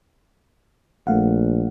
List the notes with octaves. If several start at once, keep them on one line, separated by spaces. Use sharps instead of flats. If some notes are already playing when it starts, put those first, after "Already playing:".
A#1 A3 F5 F#5